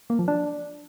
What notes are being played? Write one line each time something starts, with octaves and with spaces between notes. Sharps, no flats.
A#3
F3
D4